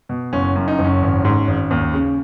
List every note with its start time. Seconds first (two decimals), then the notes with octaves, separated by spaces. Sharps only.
0.09 B2
0.33 F#1 C#4
0.55 F#2
0.68 D#4
0.79 F#1
0.85 C#4
1.02 G#1
1.25 G#2
1.48 G#1
1.71 D#2
1.94 C#3